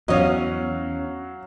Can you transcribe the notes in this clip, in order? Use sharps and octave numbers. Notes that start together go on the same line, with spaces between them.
E2 F#3 C#4 D#5 F5